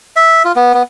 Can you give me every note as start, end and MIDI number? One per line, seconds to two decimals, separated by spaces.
0.16 0.43 76
0.45 0.52 65
0.56 0.72 59
0.74 0.83 59